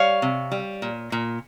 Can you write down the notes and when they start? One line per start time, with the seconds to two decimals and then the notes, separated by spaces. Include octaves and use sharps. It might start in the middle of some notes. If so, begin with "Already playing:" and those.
Already playing: G3 C#5 F5
0.22 C3
0.52 G3
0.82 A#2
1.12 A#2